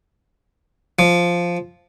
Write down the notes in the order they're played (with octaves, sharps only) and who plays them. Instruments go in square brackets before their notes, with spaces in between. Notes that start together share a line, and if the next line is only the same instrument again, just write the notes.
[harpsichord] F3